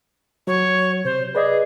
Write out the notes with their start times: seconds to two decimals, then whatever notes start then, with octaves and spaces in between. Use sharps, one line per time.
0.47 F#3 C#5
1.05 C3 C5
1.35 G#4 B4 D5 D#5